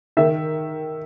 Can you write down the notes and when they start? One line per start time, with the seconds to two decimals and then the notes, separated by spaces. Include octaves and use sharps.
0.17 D#3 E5